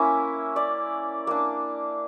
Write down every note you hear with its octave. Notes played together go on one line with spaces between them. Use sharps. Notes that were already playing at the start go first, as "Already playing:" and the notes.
Already playing: A#3 C#4 E4 E5
D5
A#3 D4